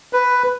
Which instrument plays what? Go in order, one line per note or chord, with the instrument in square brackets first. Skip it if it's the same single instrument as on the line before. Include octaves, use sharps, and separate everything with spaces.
[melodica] B4